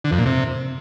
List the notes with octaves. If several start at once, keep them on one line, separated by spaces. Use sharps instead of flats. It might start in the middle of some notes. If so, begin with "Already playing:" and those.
D3
F2
A#2
C3